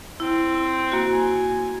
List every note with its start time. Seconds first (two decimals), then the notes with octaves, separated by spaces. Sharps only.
0.20 C4 E4
0.92 A#3 F#4
1.12 G#5